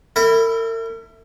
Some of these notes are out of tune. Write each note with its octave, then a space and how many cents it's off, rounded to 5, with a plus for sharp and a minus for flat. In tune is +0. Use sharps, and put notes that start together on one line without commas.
E4 +0 A#4 -45